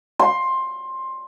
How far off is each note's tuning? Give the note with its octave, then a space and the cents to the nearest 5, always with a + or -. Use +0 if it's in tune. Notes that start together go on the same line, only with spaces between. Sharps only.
C6 +15